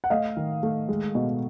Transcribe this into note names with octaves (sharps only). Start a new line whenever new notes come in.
F#5
A3 D#5 F5
D#3
A3
G#3
B2